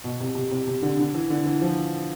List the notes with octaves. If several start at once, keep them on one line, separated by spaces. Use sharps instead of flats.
B2
C3
C3
C3
C3
D3
D3
E3
D3
E3
F3